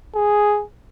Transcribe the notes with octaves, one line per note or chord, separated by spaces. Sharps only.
G#4